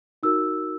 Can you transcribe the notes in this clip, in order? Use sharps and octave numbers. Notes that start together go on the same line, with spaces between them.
D#4 F#4 A#4 E6